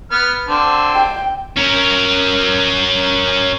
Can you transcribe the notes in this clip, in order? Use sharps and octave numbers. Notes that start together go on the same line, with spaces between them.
B3 F6
D3 C4
G5
C#4 A#4